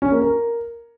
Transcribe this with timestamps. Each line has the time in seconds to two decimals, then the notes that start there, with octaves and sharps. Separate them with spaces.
0.02 C#4
0.12 A#3
0.22 A#4